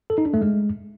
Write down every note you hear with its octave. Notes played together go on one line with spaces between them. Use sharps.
A4
D#4
D4
A3
G#3